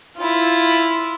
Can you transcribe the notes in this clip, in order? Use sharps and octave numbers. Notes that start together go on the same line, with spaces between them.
E4 F4